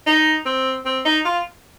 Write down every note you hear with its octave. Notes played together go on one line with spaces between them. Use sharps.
D#4
C4
C4
D#4
F4